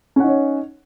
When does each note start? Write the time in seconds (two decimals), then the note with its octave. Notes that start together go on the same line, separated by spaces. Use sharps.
0.16 C#4
0.20 F#5
0.24 D#4
0.27 C#5